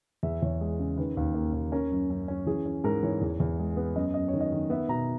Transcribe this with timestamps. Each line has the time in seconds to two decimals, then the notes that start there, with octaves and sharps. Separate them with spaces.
0.23 E2 E5
0.42 E2 C#5
0.61 G#3
0.79 C#3
0.98 D#3 B4
1.17 D#2
1.35 A#3
1.53 D#2
1.72 C#4 A#4
1.92 F#2
2.10 F#2
2.28 C#4
2.46 E3 G#4
2.66 C#4
2.84 G#2 A#4
3.03 E3 C#5
3.21 E2
3.40 E2
3.59 G#3
3.77 B3
3.95 F#2 D#5
4.14 F#2 D#5
4.28 C#5
4.34 D#3
4.41 D#5
4.52 D#3
4.70 B3 E5
4.89 B2 A#5